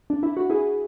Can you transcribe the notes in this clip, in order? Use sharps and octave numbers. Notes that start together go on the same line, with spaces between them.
D4
E4
F#4
E4 G#4